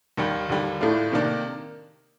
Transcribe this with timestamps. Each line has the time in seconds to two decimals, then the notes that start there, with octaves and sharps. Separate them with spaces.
0.17 D#2 D#3 G3
0.49 D#2 D3 G3
0.81 A2 A3 D4 F4
1.12 C3 D#3 A#3 D4